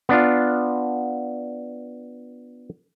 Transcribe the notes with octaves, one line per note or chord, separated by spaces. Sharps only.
B3 D4 F4